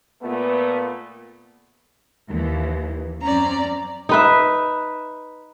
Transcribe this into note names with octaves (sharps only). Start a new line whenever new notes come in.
A#2 A3 B3
D#2 E3
F#2 C4 C#4 D5 A#5
D#4 B4 E5